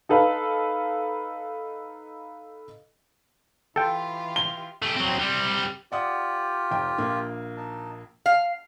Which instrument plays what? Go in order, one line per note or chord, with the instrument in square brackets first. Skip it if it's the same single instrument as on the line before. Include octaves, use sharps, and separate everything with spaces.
[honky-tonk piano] D#4 A4 B4 F5
[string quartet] E3 F4 G4 [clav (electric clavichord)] A4 G5
[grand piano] G7
[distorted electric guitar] A3 G4
F#3 C4
G3 C4
[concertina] F4 G4 [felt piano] D5 F#5 D#6
[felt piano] F1 G5
A#1 A#3
[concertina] D#4 A5
[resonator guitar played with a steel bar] F5